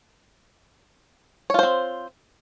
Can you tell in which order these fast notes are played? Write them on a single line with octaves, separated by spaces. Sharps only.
C#5 F4 C5 C4